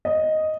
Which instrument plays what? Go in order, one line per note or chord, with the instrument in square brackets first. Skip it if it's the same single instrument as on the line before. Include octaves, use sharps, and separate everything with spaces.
[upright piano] D#5